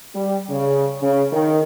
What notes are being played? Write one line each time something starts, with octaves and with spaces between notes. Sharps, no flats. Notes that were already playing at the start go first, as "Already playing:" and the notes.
G3
C#3
C#3
D#3